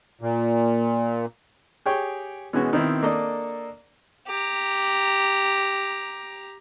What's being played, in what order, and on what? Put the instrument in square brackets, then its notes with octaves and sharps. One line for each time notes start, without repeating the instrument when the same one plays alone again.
[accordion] A#2
[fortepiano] G4 G#4 C#5 G5
B2 E3 G#3 B3 C#4 F#4
B2 D#3 C4 E4
A#3 D4 A4 D5 D#5
[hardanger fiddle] G4 A#5